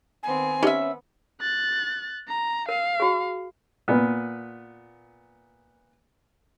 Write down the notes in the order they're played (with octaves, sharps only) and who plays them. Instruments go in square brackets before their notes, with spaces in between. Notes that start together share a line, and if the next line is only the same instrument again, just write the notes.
[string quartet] D#3 B3 C4 [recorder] G#5
[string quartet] B3 [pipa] C#4 E5 [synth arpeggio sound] D#4 G4 D#5
[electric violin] F#6 A6
A#5
[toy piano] A#4 [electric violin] F5
[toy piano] F#4 G#4
[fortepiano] A#2 B3